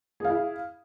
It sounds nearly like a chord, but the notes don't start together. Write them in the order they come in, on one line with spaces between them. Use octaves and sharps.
G#4 F5 E4